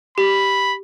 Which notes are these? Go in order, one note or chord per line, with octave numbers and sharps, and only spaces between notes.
G4 B5